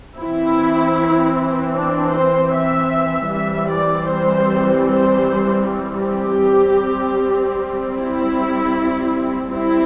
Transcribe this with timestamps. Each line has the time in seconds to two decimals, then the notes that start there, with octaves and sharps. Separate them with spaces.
0.19 E3 C4 E4
1.75 D4
2.13 C5
2.53 E5
3.30 E3 G3 C4 E5
3.69 D5
4.08 C5
4.86 C5
6.02 G4
6.41 G3 C4
7.97 E4
9.52 G3 C4 E4